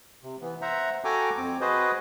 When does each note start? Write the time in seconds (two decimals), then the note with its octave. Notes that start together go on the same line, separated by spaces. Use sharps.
0.23 C3
0.41 E3 B3
0.62 C5 E5 F#5 A#5
1.04 F#4 A4 G5 G#5 A#5 D6
1.37 F2 C4 D6
1.61 F#4 G#4 B4 C5 D#5